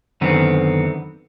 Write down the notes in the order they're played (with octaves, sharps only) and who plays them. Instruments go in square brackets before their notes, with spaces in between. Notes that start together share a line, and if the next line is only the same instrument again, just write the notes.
[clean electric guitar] F#2 D3 D#3 B3 C4